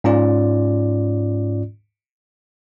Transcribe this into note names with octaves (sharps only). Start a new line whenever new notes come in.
G#2 C#4 F4 D5